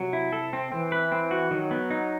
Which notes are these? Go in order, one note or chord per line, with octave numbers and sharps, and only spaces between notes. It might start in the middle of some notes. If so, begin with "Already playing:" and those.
Already playing: C3 F#3
E4
A4
C4
E3 C4
B4
C4
F#4
D#3 F#3
B3
D#4